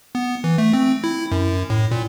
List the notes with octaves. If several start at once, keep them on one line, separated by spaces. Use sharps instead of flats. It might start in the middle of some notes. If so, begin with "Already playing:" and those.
B3
E3
A3
C4
E4
F#2
A2
A#2